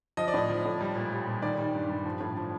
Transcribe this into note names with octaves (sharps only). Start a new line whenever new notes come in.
F3 D#5
D5
A2 D#5
F3
A2
G3
A#2
G3
A#2
D#3 D5
G3
G2
G2
F3
A2
F3